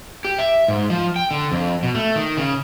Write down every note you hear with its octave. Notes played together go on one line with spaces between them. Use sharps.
G4
E5
G#2
F3
G5
D3
F2
B2
A3
D#3
C#3